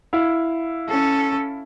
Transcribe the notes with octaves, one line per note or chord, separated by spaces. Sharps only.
E4 F5
C#4 A4